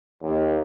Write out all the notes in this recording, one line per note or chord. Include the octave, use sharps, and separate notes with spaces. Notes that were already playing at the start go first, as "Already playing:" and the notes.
D#2